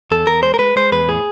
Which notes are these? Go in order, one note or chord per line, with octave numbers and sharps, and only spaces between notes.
E2 A4
E2 A#4
G#3 C5
A#4
G#3 B4
G#3 C5
E2 B4
A2 G#4